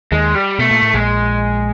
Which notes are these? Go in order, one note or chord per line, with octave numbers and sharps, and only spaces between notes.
D#2 D#3 G#3
G3
B2 A3
A#2
A2
A#1 A#2 G#3